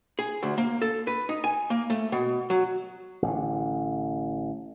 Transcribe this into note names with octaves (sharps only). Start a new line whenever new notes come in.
G#4
D2
A#3
A4
B4
D#4
G#5
A#3
A3
B2
F#3
A1 D3